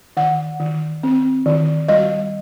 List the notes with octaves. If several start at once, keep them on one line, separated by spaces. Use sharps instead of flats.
D#3 F#5
D#3
C4
D#3
G3 D#5